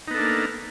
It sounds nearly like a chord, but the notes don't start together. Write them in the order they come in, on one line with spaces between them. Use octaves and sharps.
D#4 B3 A4 D4 A#3